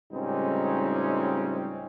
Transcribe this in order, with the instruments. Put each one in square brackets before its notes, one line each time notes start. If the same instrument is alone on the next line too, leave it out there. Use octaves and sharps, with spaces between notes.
[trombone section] C#2 A2 G3 C4 C#4 D#4